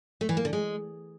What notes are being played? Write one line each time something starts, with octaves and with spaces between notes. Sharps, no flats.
A3
E3
A#3
D3
G#3